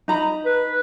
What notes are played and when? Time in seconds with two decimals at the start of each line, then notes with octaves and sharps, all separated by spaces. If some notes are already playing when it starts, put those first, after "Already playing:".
0.08 D#4 A#5 B5
0.45 B4